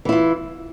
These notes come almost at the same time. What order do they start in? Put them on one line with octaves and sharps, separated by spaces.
E3 E4 F4